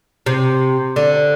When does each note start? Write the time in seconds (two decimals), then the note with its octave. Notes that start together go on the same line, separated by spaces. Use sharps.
0.26 C3
0.96 D3